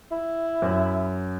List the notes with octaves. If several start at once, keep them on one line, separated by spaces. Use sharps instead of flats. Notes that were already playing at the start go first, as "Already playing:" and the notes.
E4
F#2